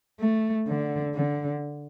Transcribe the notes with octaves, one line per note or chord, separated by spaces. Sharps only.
A3
D3
D3